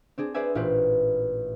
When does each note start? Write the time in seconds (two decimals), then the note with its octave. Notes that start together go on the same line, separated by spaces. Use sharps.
0.18 C4 D4 G#4
0.34 G#4 B4 C5 D5 E5 G#5
0.55 A1 A#2 F4 G4 B4